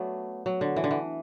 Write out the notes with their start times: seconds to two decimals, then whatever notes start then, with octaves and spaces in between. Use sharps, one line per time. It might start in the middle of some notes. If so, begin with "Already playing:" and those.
Already playing: F#3 A3 B3 D4
0.46 F#3
0.61 D3
0.76 E3
0.84 D3
0.91 E3